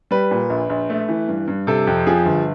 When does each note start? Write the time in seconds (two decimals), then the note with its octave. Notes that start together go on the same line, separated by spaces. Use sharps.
0.11 G3 B4
0.31 A#2
0.50 A#1
0.70 A#1
0.90 A3
1.09 E3
1.28 G2
1.48 G2
1.67 C3 A4
1.87 F2
2.07 F3 G#4
2.26 G1